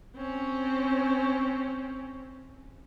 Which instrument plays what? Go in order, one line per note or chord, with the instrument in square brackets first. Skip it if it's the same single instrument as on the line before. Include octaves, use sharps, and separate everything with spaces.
[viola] C4 C#4